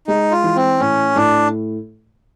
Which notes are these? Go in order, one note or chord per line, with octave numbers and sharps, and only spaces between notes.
G#3 D#4
F4
E3
C4
A2 C#4
A2 D4